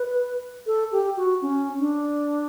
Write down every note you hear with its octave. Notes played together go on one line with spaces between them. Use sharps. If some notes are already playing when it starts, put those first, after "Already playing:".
Already playing: B4
A4
G4
F#4
C#4
D4